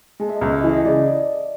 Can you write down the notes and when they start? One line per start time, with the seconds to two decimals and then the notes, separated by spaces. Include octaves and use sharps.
0.20 G#3 A4
0.29 E5
0.36 D#5
0.41 C#2
0.52 E5
0.64 E3
0.69 D#5
0.85 C#3 D5